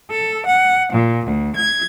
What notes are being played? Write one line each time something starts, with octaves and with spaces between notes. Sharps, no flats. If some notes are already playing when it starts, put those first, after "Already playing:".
A4
F#5
A#2
D2
G#6